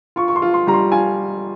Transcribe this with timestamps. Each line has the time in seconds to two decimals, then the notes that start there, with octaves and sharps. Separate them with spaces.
0.16 F4 C#6
0.28 C#6
0.36 C6
0.42 F4
0.54 C6
0.67 G3 A#5
0.74 C6
0.92 F4 G#5